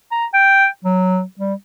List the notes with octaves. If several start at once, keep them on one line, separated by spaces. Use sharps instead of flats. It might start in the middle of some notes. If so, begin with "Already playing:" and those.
A#5
G5
F#3
G3